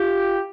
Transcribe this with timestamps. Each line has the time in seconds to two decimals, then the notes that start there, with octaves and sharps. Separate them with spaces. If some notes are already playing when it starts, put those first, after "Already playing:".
Already playing: F4 G4